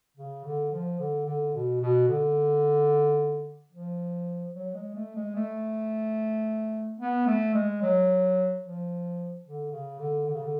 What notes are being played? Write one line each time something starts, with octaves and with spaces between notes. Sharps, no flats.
C#3
D3
F3
D3
D3
B2
B2
D3
F3
F#3
G#3
A3
G#3
A3
B3
A3
G#3
F#3
F3
D3
C#3
D3
D3
C#3
D3